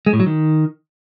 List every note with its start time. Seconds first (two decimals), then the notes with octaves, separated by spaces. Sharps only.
0.06 G#3
0.13 A2
0.20 F#3
0.26 D#3